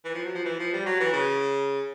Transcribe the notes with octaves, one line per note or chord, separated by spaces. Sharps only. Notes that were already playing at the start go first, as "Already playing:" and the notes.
E3
F3
F#3
F3
E3
F3
G3
F#3
E3
C#3